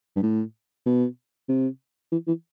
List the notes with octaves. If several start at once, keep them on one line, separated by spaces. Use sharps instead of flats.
G2
A2
B2
C3
E3
E3